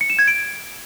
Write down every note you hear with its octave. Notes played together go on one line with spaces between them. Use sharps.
C#7
E7
G#6
D7